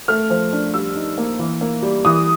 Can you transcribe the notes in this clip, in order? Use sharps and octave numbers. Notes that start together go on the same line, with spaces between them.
A3 F6
F3
D4
G3 E6
D#4
A#3
E3
A#3
G3
E3 D#6